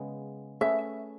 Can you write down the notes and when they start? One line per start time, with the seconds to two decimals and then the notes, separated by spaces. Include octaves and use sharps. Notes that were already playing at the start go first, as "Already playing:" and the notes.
Already playing: C#3 G#3 B3
0.61 A3 C#4 G#4 B4 E5